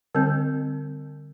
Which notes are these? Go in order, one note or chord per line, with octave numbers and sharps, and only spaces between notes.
D3 G3 C4